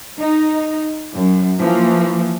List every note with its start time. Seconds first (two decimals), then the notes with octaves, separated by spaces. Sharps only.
0.18 D#4
1.15 F#2
1.59 E3 F3 A#3